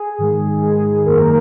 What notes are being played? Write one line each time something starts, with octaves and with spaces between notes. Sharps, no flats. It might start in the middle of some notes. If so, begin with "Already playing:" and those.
Already playing: G#4
G#2 D#3 G#3
G#4
F#2 D#3 A#3 A#4